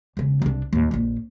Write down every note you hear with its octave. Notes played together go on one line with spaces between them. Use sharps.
E1 C#3
C2 D4
D#2 A2
A#1 F2